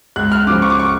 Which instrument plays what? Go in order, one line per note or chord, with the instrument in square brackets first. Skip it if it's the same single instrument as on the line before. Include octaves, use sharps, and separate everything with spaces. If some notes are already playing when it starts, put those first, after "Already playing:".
[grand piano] C#2 F#6
F6
C#3 F3 D6
C#6
D6
C#6